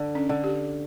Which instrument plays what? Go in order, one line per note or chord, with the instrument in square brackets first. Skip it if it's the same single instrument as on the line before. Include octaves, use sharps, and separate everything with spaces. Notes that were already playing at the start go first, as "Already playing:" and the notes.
Already playing: [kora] D3
[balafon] C#4
[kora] D3
[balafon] G4